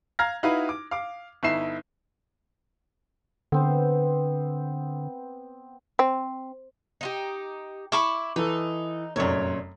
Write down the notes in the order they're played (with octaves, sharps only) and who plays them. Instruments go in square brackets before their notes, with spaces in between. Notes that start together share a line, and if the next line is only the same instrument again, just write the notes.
[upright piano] F5 A#5 F6 G#6 A#6
D#4 E4 F#4 B4 F5
D6
F5 D6
G1 D#4 E4 E5 C7 E7
[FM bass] D3 [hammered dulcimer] B3 C4 C5
[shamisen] C4
[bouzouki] D#4 F4 G4
[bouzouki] E4 [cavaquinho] B5 C#6 D6
[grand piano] E3 A4 [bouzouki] D#4
[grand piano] F1 F#2 [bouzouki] A#2 C#5